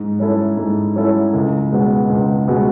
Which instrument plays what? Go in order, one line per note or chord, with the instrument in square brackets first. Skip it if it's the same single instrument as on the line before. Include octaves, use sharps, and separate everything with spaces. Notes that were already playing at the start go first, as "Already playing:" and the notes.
Already playing: [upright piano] G#2
F#3 C#4 E4 A4
G#2
F#3 C#4 E4 A4
C#2
B2 G#3 B3 F#4
C#2
B2 G#3 B3 F#4